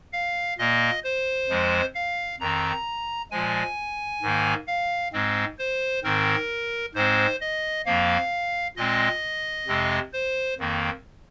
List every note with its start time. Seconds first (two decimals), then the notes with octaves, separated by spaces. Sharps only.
0.13 F5
0.58 A#2 A#3 D#5
1.04 C5
1.49 F2 F3 G#3
1.95 F5
2.40 F2 D#3 C4 A#5
3.31 A#2 F3 G#3 G#5
4.22 G#2 D#3 A#3
4.67 F5
5.13 G#2 G#3 C4
5.58 C5
6.04 G#2 D#3 C4 A#4
6.95 G#2 G#3 C4 C5
7.41 D#5
7.86 F2 F3 A#3 F5
8.76 A#2 G#3 C4 D#5
9.67 F2 C3 G#3 C4
10.13 C5
10.59 F2 D#3 A#3